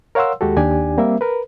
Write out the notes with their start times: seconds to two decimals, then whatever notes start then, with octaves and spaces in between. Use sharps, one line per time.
0.15 A#4 C#5 F5 F#5 C6 E6
0.41 D#2 G#3 F#4 G4 A4
0.57 D#2 D4 G4 D5 G#5
0.98 G3 A#3 C4 A#4 E5
1.21 A#4 B4